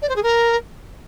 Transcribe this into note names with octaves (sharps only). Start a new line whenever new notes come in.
D5
C5
G#4
A#4